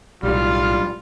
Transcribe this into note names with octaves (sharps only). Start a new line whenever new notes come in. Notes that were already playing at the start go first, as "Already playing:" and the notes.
B1 A2 G3 F4 F6